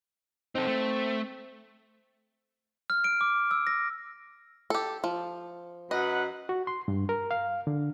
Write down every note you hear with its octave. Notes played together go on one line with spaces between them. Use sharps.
C4 D#4 A4
A3
F6
D7
D6
E6
A#6
G4 A4
F3
F#2 B4 D#5 F#5
F#4
C6
G2
A#4
F5
D3